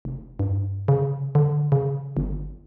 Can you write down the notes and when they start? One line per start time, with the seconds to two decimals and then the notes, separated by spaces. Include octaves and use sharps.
0.05 F1
0.39 G2
0.88 C#3
1.35 D3
1.72 C#3
2.17 G1